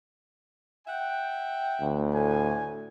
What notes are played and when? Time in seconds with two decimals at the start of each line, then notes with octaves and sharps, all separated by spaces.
0.87 E5 F#5 G5
1.81 D2
2.14 A2 G#5